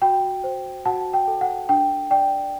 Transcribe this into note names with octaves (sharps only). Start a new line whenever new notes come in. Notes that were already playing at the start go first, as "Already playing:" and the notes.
F#4 G5
C5
F#4 F#5 A5
G5
A4
F#5
D4 G5
D5 G5